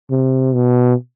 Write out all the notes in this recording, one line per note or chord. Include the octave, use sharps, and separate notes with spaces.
C3
B2